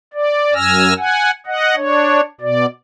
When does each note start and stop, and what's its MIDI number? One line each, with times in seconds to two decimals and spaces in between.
0.13 0.54 74
0.54 0.94 42
0.54 0.94 80
0.54 0.94 88
0.54 0.94 89
0.54 0.94 94
0.98 1.31 78
0.98 1.31 80
1.46 1.75 75
1.46 1.75 78
1.76 2.21 62
1.76 2.21 73
2.41 2.66 47
2.41 2.66 74